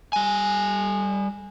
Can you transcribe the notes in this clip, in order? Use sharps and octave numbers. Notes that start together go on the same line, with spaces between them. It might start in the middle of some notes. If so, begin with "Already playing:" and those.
G3 G#5